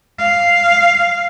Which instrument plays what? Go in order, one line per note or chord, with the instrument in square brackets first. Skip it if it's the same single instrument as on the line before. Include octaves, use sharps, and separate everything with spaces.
[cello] F5